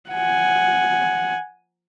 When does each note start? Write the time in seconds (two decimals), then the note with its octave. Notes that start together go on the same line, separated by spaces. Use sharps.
0.10 F#5 G#5